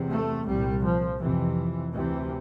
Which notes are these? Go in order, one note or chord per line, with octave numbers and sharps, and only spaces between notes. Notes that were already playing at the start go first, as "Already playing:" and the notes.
Already playing: E2 C3
A3
C2 A#2 G3
F3
F2 C3 E3
D2 C3 E3